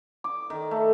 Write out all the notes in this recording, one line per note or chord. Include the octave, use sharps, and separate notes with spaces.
D6
D#3
A3